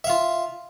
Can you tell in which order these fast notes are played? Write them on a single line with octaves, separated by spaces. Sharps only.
E5 F5 F4